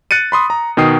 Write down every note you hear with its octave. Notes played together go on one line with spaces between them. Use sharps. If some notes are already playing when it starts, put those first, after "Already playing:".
F#6 A6 C#7 D#7
B5 C6 D#6
A#5
B2 D#3 G5 D#6 C7